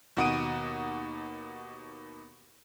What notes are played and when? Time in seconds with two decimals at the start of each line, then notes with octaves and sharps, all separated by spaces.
0.17 D#2 B2 F#5 D#6 D7 D#7